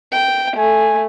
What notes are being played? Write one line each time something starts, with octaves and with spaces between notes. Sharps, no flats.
G5
A3 G#5